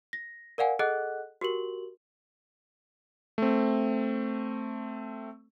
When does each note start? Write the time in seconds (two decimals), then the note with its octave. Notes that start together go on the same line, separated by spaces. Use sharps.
0.13 A#6
0.58 A#4 D5 F5 F#5 G#5
0.79 G#4 A4 D#5 F#5 F#6
1.41 F#4 G4 A#4 F#7
3.38 A3 C4